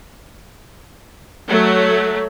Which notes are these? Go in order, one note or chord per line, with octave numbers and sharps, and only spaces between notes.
F#3 A3